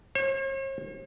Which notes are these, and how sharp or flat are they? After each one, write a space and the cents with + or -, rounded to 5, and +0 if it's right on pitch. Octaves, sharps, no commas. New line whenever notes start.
C#5 -45